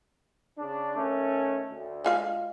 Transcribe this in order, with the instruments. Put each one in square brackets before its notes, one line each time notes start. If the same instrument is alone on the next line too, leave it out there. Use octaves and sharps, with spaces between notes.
[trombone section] C#3 D4
D#3 A3 C#4
D2
[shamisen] G#3 F4 F5